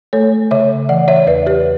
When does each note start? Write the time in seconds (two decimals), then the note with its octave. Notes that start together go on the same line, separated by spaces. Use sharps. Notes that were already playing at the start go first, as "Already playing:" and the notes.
0.13 A3 A4 C#5
0.51 C#3 C#5 E5
0.89 E3 D5 F#5
1.08 C#5 E5
1.27 E2 B4 D5
1.47 G4 B4